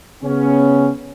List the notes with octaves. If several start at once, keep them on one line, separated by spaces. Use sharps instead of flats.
C#3 B3 C#4